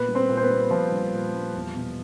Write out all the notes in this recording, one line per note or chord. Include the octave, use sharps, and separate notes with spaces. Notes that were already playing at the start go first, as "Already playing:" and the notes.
Already playing: A#2 B3 B4
G3
C4 C5
A#2
C5
B3 B4
G3
A#2 F3 F4
G3
A#2
G3
E2
B2